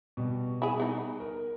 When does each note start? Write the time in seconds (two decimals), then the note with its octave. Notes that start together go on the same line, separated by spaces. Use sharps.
0.17 B2 G3
0.62 E4 G#4
0.80 B3 D#4
1.20 A#4